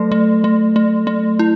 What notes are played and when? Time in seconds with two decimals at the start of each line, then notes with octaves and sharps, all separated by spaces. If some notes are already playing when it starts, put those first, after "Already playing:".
Already playing: F#3 A3 A4
0.12 A3
0.44 A3
0.76 A3
1.07 A3
1.39 E4